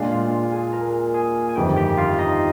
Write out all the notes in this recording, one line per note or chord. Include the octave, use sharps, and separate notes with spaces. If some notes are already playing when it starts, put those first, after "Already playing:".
Already playing: A#2 G#3 D4 F4 F5
F4 F5
F4 F5
G#4 G#5
A#4 A#5
G#4 G#5
G#5
G1 F2 D#3 G4 G5
G4 G5
F4 F5
D#4 D#5